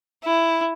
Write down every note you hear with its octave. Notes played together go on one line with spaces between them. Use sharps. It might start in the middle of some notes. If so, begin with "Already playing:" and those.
E4